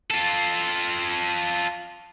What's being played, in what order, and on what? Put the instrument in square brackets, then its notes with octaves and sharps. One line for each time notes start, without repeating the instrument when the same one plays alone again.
[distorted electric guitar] F4 A4